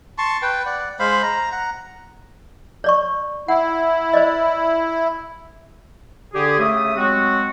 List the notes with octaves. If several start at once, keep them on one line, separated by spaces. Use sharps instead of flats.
A5 C6 C#6
B4 G5
D5 F#5
G#3 C5 F5 B5
A#5
F#5 A#5
C#5 D5 C#6
E4 F#5
C5 D5 D#5
D3 G4 G#4
C#3 A3 G4 E5 D#6
F#3 G#3 C4 F#4